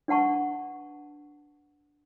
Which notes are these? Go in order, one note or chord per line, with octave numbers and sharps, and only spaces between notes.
D4 B4 F#5 A5 C#6